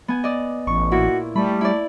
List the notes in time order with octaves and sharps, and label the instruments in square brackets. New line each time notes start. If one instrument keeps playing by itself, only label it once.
[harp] B3 G#5
D5 D#5
[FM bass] A1 [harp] C#6
[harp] A#2 E4 [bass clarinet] F#4
[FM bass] G3 [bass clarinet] A3 [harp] B5
[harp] E4 D5